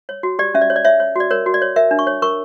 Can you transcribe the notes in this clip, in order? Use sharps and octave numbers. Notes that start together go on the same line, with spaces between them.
C#5
F#4
G4 D5
C#4 E5
D5
C#5
D5
C#5 E5
C#5
F#4 D5
A#4 C#5
F#4
D5
C#5
A#4 E5
D4
C#6
C#5
A#4 C#6